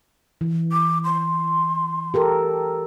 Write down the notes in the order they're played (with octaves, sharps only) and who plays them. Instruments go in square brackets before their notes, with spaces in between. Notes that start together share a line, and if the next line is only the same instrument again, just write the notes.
[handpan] E3
[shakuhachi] D6
C6
[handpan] G4 A4 A#4